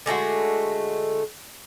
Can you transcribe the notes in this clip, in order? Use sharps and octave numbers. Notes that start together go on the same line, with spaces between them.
D3 G#3 A3 F#4